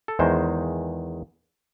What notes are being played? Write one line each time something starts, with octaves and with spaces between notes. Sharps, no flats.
A4
E2 D#3 G#3 C5